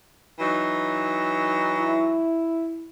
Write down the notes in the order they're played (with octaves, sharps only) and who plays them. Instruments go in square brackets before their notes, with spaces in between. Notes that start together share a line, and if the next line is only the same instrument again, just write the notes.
[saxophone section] E3 F#3 D#4
[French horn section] E4